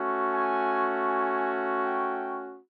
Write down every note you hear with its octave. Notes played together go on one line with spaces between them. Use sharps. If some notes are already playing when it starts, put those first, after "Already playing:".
Already playing: A3 C#4 F#4
G#5
G#5
G5